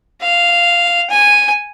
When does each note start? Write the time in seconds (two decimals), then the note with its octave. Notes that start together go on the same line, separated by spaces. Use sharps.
0.21 F5
1.10 G#5